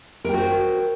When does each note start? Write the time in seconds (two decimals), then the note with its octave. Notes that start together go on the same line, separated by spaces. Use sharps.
0.25 A#4
0.29 G5
0.33 F#4
0.37 C5